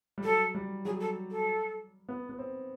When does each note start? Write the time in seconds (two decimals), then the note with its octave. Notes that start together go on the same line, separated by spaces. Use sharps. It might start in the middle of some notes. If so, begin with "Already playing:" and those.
0.18 G3
0.24 F#3 A4
0.55 G3
0.85 F#3 G#4
1.00 A4
1.31 A4
2.09 B3
2.29 B3
2.39 C4